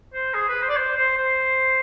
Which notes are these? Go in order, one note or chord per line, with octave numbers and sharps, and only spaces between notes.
C5
G#4
B4
C5
D5
C5
C5
C5